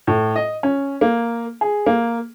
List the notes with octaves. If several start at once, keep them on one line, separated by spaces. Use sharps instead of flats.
A2
D#5
C#4
A#3
G#4
A#3